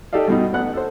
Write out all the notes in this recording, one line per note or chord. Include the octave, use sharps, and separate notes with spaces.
D#4 G4 A4 D5 F5
G2 B2 D#4
A1 D2 B3 F#5 F#6
A4 C5